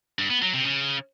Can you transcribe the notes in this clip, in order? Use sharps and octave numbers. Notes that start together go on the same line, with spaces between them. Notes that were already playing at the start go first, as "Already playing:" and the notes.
G2
B3
F#3
C3
C#3